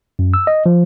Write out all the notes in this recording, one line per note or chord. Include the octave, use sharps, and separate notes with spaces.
F#2
E6
D#5
F3